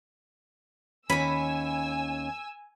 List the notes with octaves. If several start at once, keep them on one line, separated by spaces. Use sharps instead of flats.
D#2 C#4 G#5 B5 E6